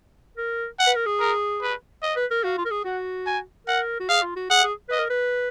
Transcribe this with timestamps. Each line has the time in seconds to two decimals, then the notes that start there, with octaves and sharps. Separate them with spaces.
0.37 A#4
0.79 F#5
0.87 B4
0.96 A#4
1.06 G#4
1.20 A#4
1.61 B4
2.02 D#5
2.16 B4
2.31 A#4
2.44 F#4 F5
2.58 F4
2.65 A#4
2.71 G#4
2.85 F#4 F#5
3.26 G#5
3.67 A#4 F#5
4.00 F#4
4.09 G#4 F5
4.22 F4
4.36 F#4
4.50 G#4 F#5
4.63 G#4
4.89 B4 D#5
4.99 A#4
5.10 B4